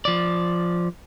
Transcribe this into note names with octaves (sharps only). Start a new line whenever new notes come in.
F3 D5